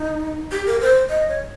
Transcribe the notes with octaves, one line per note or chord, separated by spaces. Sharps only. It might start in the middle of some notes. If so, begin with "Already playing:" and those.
Already playing: D#4
G4
A#4
C5
D#5
C#5